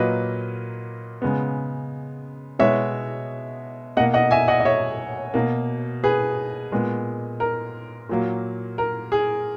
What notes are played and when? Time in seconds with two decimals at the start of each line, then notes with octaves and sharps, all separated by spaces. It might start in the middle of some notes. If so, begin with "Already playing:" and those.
Already playing: A#2 F#3 A#3 B4 D#5
1.22 C#3 G#3 B3
2.59 B2 G#3 B3 C#5 E5
3.97 B2 D#5 F#5
4.00 A#3
4.14 D#5 F#5
4.31 E5 G#5
4.48 D#5 F#5
4.60 D#5
4.65 C#5 E5
5.34 B2 A#3
6.04 G#4 B4
6.72 A#2 G#3 B3
7.40 A#4
8.09 A#2 F#3 A#3
8.78 A#4
9.12 G#4